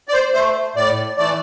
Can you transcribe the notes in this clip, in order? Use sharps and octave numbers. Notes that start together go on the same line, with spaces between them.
D5
C5
A3 C5
A2 D5
E3 A3 D5